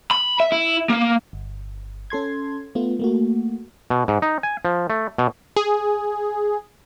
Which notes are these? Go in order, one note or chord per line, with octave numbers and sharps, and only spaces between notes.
B5
E5
E4
A#3
G1
C#4 A4 C6 G#6
A3 B3 F4
A3 A#3 F#4
B2
G#2
D#4
G#5
F3
A3
B2
G#4